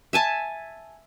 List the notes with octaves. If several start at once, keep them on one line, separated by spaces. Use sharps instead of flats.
E5 G#5 A5